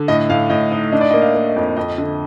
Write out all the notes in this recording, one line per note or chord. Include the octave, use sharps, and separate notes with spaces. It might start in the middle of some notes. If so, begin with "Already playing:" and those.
Already playing: D3
A2 D#5
A2 F5
A2 D#5
D#4 D#5
D4 D#5
D5
D#5
A#3
F5
A#3
D#5
F2
F2 D#5
D3